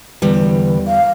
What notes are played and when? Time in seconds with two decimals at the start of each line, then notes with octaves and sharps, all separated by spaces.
0.22 E2 D3 E3 G3 B4
0.87 F5